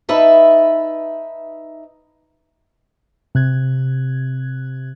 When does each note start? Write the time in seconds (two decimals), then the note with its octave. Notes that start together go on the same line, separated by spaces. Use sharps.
0.09 D#4 B4 E5 A5
3.35 C3 F#6 G#6